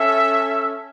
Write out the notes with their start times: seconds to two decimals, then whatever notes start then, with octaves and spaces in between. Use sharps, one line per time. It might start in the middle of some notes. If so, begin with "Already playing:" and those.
Already playing: C#4 A4 E5